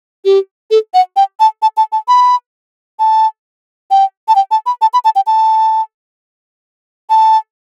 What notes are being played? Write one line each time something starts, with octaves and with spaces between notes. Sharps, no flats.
G4
A4
F#5
G5
A5
A5
A5
A5
B5
A5
G5
A5
G5
A5
B5
A5
B5
A5
G5
A5
A5